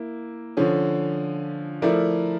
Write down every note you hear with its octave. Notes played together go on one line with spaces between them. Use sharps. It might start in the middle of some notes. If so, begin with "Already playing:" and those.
Already playing: A#3 E4
D3 F3 C#4
F3 A3 E4 A#4 D5